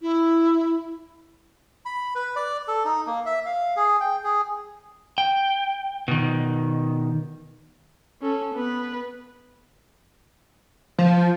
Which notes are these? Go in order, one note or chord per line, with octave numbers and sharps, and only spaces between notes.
E4
B5
B4
D5
A4
D#4
A#3
E5
F5
G#4
G5
G#4
G5
B2 D#3
C#4 A4
B3 B4
F3